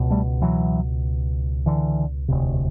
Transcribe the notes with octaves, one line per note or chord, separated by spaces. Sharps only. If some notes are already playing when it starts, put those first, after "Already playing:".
Already playing: C#2 B2
G3 A3
E3 F#3
D3 E3
E1 D2 C3